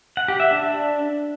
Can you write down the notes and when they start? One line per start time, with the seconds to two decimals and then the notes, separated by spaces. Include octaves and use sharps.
0.17 F#5
0.28 G4
0.40 E5
0.51 D4